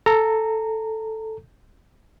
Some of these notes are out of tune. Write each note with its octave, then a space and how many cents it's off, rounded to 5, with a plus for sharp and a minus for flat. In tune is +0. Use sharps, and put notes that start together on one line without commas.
A4 +0 A#5 -15